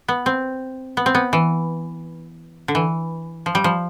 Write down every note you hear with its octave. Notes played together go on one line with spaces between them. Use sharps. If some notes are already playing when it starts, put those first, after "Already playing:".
B3
C4
B3
C4
B3
E3
D3
E3
F3
G3
F3